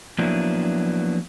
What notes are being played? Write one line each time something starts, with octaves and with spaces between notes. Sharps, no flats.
F3 F#3 A#3 B3 D4 E4